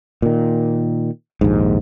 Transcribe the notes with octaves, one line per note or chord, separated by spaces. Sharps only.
A#2 D#3
A#1 D#2 G#2